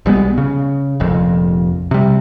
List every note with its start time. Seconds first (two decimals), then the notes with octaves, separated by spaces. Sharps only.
0.06 B1 G3 G#3 B3
0.38 C#3
1.00 F1 A#1 F2
1.91 C3 G3